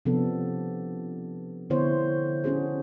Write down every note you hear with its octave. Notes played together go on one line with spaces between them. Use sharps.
C3 F3 B3 D4 A4
D3 B3 E4 C5 C#5
C#4 D4 F#4 G#4 C5